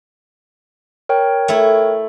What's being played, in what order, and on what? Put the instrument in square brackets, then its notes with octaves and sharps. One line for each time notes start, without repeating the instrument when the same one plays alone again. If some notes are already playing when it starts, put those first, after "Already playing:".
[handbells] A#4 C#5 G5
[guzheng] A3 E4